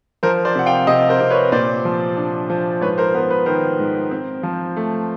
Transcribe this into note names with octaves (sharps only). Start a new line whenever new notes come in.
F3 A#4 C5
C5 D5
C3 F#5
F5 G5
C3 D#5 F5
A#4 C5
C3
B4 C#5
A#2 C5 D5
F3
D4
F3
G#2 B4 C#5
A#4 C5
B3 A#4
B4
D#3 A#4 C5
G#2
C4
F3
A3